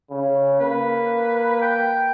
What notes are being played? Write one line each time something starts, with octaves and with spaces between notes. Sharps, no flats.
C#3
A#3 B4
G5